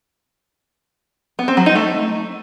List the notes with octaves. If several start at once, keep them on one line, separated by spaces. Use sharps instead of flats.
B3
C4
F#3
D#4
A3